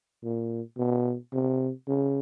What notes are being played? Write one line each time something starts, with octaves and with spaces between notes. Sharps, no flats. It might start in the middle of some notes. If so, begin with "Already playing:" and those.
A#2
B2
C3
C#3